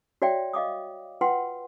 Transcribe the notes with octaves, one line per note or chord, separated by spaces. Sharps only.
F#4 C#5 D5 E5 G5
D#5 F5 D6 D#6
F4 B4 F#5 G5 C6